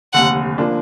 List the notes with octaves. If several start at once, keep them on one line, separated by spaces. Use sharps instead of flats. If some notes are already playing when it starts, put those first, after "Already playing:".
F1 D#2 D3 F#5
F3 A#3 D4